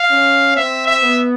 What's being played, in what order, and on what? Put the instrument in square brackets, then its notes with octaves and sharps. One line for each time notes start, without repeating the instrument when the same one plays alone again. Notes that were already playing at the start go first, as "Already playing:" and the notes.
Already playing: [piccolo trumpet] F5
[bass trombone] C#4
[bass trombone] C4 [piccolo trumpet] E5
[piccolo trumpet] E5
[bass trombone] B3